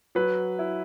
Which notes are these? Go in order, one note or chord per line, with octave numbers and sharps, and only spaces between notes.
F#3 B4
E4